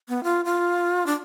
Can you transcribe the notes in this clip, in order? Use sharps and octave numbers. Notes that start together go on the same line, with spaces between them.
B3
F4
F4
D4